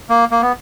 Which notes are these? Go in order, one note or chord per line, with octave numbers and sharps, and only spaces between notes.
A#3
A#3
B3